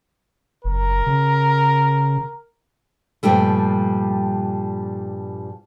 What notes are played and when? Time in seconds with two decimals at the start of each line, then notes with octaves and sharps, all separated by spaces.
0.64 F#1 A#4
1.06 C#3
3.23 G2 A#2 F3 G3 A3